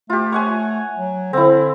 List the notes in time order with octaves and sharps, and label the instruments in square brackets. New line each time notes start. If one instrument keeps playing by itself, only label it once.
[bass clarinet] A3 [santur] F4 G4
[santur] C#5 F#5 G#5
[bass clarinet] F#3
[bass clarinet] D3 [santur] C4 E4